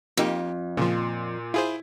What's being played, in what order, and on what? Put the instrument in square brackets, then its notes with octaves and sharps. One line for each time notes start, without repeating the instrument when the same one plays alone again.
[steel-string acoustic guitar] F2 [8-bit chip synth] A#3 D#4 G4
[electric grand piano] A#2 C6 [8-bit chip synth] C#3 F3
[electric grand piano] E4 [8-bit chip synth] F4 G#4 C5